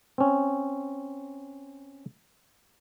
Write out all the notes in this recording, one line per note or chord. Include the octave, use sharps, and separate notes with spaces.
C4 C#4